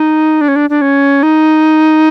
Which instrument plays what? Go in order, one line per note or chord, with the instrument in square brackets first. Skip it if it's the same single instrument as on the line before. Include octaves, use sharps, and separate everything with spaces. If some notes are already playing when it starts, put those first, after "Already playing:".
Already playing: [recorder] D#4
D4
C#4
D4
D4
C#4
D#4